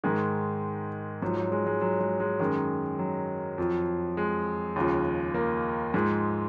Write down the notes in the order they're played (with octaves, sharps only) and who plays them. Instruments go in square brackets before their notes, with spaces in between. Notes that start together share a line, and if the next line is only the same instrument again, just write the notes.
[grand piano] G#2 D#3 G#3
G#2 F3 F#3
F#3
G#3
G#3
F#3
G#3
G#3
F#2 D#3 G#3
F#3
F2 F3
G#3
D#2 C#3 F3
A#3
G#2 F3 G#3